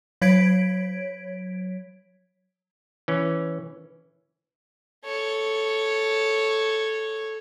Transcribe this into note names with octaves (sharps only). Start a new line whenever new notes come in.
F#3 C#5 G#6 B6 D7
E3 C#4
A4 C#5